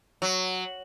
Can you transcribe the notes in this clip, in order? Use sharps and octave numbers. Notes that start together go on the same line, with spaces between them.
F#3